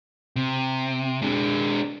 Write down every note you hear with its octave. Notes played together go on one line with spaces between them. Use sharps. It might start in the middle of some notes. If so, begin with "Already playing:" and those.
C3
G#3 D4